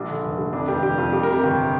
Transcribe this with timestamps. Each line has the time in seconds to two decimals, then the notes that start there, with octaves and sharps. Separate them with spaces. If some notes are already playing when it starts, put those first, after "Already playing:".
Already playing: A#1 G3 D4
0.09 D3
0.23 F1
0.38 G3
0.53 F2 D4
0.68 F1 G4
0.83 F1 G4
0.98 F2 F4
1.13 G3 G4
1.23 A#4
1.29 C3 G4
1.43 G1 G4